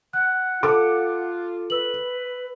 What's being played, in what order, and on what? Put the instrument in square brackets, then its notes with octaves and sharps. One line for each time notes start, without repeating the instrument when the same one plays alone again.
[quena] F#5 [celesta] F#6
[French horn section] F4 [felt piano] A4 D6
[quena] B4 [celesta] E6 F#7